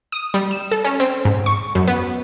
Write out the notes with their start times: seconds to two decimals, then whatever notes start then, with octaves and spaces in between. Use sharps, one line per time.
0.12 D#6
0.34 G3
0.51 E7
0.71 A4
0.84 C#4
1.00 C4
1.25 G#2
1.46 C#6
1.75 F#2
1.87 B3